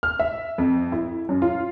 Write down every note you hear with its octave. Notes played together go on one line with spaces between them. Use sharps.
F6
E5
F2
E4
F#2
F4